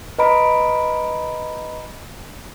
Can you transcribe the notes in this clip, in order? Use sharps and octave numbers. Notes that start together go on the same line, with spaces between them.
B4 D#5 A#5 B5 D7